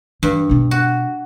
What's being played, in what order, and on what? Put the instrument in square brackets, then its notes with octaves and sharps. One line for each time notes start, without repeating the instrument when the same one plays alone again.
[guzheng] G2 [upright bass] E3
[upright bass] B2 D4
[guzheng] F#4